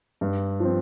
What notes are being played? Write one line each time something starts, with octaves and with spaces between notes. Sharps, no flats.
G2
F3 C4